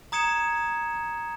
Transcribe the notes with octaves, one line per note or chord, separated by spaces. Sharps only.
A#5 D#6 G#6 C#7 E7